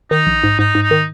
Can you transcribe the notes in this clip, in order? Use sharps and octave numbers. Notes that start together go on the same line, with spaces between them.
D#3 D#4
A#1
G#2
G#2 D#4
G#2
D#4
D#3